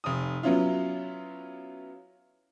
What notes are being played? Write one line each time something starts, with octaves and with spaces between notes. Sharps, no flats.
F1 D#6
F#3 B3 C#4 E4 F4